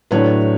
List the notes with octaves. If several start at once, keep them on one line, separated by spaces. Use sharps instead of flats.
A2 F#3 A3 D4 B4 C#5